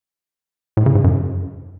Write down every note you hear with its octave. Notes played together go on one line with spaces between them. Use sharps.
A2
C#3
G#2
F#2